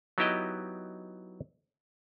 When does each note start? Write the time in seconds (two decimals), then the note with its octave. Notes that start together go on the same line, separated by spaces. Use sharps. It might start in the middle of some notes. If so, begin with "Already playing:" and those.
0.18 F#3 B3 D#4 E4 G4 D#5